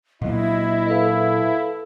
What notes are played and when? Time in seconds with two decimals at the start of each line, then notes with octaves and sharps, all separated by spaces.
0.22 A#2 F#3 A#3 E4 D#5
0.88 A4 B4 F5